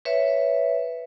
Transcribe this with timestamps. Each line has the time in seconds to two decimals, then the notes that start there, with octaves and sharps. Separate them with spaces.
0.05 B4 C#5 E5